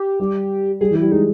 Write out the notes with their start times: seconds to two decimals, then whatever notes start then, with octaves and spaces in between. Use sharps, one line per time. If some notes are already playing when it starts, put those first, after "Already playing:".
Already playing: G4
0.20 G3
0.81 G3 G#4
0.91 E3
0.96 E4
1.02 G3
1.12 G#3 D#4